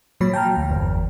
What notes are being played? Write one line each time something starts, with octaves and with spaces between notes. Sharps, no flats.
A#2 F3 F#3 C#5 B5
G5 A5 A#5 F6
D2
G1 E2